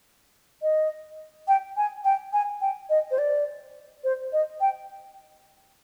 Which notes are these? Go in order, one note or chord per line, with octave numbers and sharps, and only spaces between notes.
D#5
G5
G#5
G5
G#5
G5
D#5
C5
D5
C5
D#5
G5